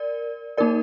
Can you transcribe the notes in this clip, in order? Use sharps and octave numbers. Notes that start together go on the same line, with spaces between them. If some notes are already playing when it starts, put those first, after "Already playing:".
Already playing: A#4 D5
A#3 D#4 A#4 D5